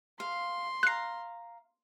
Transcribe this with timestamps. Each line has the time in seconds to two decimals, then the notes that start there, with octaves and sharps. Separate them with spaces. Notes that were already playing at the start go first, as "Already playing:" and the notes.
0.20 F5 C6
0.83 F5 A#5 F#6 C7